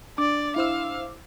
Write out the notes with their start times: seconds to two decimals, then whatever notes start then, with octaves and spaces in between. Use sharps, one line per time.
0.18 D4 D5 D6
0.56 E4 C5 F5 E6